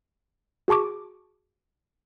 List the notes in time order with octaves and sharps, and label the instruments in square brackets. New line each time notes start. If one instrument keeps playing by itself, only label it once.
[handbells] F#4 G#4 A5 C#6 D6